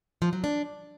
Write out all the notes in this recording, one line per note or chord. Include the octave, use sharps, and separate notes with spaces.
F3
F#3
D4